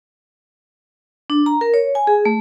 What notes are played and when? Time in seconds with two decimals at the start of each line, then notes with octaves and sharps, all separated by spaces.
1.30 D4
1.46 A#5
1.61 A#4
1.74 C#5
1.95 G#5
2.07 G#4
2.25 A3